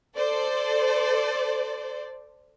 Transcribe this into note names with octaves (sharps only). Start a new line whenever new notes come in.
A4 C5 D5